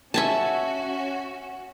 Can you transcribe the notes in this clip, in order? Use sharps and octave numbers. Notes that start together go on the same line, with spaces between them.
C#4 F#4 E5 G#5 A5